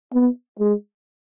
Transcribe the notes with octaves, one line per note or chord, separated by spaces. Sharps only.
B3
G#3